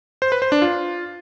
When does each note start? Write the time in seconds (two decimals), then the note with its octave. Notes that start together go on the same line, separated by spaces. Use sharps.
0.22 C5
0.32 B4
0.42 C5
0.52 D4
0.62 F4